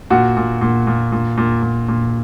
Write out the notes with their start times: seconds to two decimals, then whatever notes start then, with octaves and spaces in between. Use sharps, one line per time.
0.10 A#2 F#4
0.37 A#2
0.61 A#2
0.87 A#2
1.12 A#2
1.38 A#2
1.63 A#2
1.88 A#2